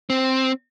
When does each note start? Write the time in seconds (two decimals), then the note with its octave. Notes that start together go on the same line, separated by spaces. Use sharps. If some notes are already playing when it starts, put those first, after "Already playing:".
0.10 C4